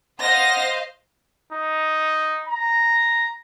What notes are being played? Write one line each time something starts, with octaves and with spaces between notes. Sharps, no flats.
C5 D#5 F5 F#5 A#6
D#4
A#5